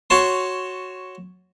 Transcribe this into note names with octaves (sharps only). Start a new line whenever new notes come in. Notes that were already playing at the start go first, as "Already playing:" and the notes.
F#4 C#5 A5 C6